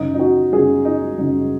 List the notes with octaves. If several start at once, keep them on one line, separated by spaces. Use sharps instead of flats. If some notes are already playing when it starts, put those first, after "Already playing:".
Already playing: F#2 C#3 D#4
D#4
F#4
F#2 C#3 G#4
D#4
F#2 C#3 D#4